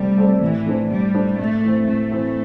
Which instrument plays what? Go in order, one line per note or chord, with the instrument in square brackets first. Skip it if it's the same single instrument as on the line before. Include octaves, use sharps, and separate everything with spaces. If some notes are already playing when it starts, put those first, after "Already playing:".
Already playing: [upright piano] C3 A3 C4 A4 D5 [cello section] G3
[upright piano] A3 C4 A4 D5
[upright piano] A2 [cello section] E3
[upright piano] A3 D4 C5
[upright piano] A2 [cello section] G3
[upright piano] A3 D4 C5
[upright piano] A2 [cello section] A3
[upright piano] E3 C4
[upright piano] A2 [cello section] A3
[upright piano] E3 C4